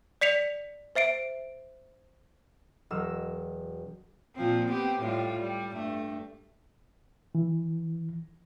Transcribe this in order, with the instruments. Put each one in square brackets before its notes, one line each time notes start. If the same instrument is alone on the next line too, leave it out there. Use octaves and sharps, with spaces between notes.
[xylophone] D5 B6 C#7 F7
C5 E5 C7 D7
[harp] E1 F#3 D#5 E6 F6 E7
[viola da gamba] A#2 F3 C4
B3 C4 G4
A2 G3 F4
G3
G2 A3
[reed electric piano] E3